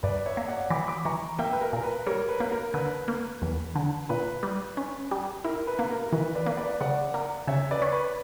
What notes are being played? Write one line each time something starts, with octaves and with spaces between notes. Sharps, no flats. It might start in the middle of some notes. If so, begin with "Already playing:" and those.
G2 B4 D5
C#5 E5
A#3
D5 F#5
E3 B5 D6
B5 D6
E3 A#5 C#6
A#3 E5 G5
B4
A#4
A#2 A#4
B4
G3 A#4 C#5
B4
A#3
A#4
D3 B4
A#3
E2
D3
A#2 B4
G3
C#4
G3
E4 A#4
B4
A#3
A#4
A#4
E3 B4
B4 D5
A#3
B4 D5
C#3 D5 F#5
A#3
C#3 C#5 E5
B4 D5
C#4
B4